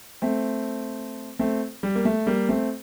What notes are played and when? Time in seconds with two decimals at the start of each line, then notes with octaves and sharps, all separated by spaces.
0.22 A3 C4
1.39 A3 C4
1.83 G3
1.95 A#3
2.05 A3
2.27 G3 A#3
2.49 A3 C4